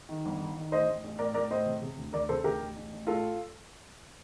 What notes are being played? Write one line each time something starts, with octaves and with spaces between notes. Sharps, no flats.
D#3
G1
D#3
D#3
A1 C5 D#5
A1
A1
A2 A#4 D5
A2 A#4 D5
A2 C5 D#5
C3
C3
D2
D2 A#4 D5
C3 A4 C5
D2 G4 A#4
A1
A1
A1
A2 F4 A4